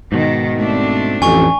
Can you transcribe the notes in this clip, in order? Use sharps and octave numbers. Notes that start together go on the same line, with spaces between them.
G#2 B2 D#3
A3 C4 D4
A1 F2 G#5 C#6